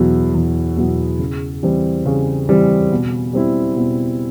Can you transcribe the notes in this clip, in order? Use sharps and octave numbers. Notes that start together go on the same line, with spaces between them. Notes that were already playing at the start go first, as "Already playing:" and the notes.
Already playing: E2 B2 F#3 B3 E4
E2
B2 F#3 B3 E4
C#3
E3 G3 C4
C#3
E3 G3 C4
B2
G3 C4 E4
B2